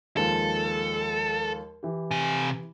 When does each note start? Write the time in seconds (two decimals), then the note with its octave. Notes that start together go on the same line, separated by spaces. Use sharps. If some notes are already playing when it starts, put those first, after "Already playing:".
0.17 D#2 F3 G#3 A4
1.83 E3 G4
2.11 C3 G#5